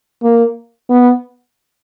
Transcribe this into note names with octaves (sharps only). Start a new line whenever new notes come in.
A#3
B3